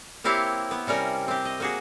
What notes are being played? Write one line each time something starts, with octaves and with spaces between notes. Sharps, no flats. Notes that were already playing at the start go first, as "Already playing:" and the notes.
A#3 C4 E4 G4 C#5 F5
B3
C3 G3 C#4 A#4
C4 G4
D#5
A#3 F#4 G#4